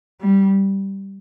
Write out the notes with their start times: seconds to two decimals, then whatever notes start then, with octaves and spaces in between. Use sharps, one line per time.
0.21 G3